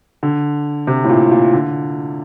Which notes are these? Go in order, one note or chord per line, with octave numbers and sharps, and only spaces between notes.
D3
C3
A2
A#2
A#2
D3